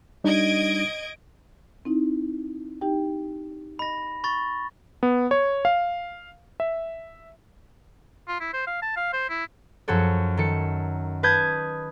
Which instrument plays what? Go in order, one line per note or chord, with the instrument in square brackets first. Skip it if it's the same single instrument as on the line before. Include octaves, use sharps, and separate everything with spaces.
[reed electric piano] G3 D4 D#4 [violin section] D#5 G#6 D7
[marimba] C4 D#4 E4
D#4 G4 G5
[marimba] D#5 [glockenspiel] B5 A#6
[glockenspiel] B5 C#6 A6
[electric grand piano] B3
C#5
F5
E5
[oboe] F4
E4
C5
F5
A5
F5
C5
E4
[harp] F#2 F3 F#4 A4 C#5
D#3 A4 C#7
B4 A5 D#6 G6 G#6